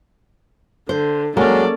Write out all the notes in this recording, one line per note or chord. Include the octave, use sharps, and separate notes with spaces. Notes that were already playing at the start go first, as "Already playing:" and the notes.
D3 C5
F#3 G#3 A#3 C#4 A4 D5